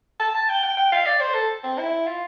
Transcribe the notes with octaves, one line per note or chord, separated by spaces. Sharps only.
A5
A5
G5
G5
G5
F5
D5
C5
A4
C4
E4
F4